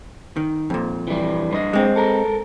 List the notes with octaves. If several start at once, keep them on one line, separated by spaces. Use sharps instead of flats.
D#3
F2 A#2
E3 G3
G2 B4 D#5
G#3 C4
A4 A#4